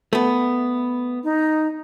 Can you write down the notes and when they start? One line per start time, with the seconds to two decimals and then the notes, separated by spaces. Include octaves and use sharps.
0.13 A3 B3
1.24 D#4